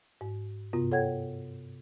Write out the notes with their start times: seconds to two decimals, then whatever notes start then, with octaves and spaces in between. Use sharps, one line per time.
0.21 G#2
0.73 G2 C3 B3 F4
0.92 A4 C#5 F#5 G5 G#6